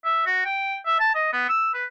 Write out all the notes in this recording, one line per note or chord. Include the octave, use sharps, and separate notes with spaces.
E5
F#4
G5
E5
A5
D#5
B3
E6
B4